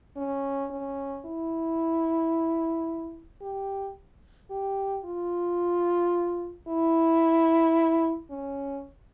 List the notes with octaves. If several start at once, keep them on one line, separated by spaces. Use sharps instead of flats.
C#4
C#4
E4
G4
G4
F4
E4
C#4